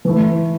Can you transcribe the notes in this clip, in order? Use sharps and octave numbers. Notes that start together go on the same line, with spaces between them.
E3 A3 E4